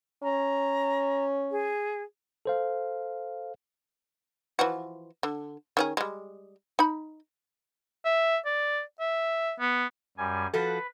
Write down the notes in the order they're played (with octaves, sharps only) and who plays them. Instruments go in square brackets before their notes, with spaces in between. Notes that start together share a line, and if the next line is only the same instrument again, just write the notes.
[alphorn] C#4 [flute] A#5
[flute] G#4
[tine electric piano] A4 C5 F5
[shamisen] E3 F3 F#4
D3
D#3 C#4 G#4
G3 G#3
D#4 B5
[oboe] E5
D5
E5
B3
[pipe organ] F#2 G3 G#5
[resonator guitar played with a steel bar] F3 F#4 A4 [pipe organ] B4